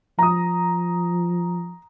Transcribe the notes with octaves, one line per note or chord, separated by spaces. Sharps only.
F3 A#5 D#6